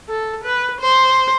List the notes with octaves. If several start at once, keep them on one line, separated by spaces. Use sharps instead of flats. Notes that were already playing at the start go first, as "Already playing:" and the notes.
A4
B4
C5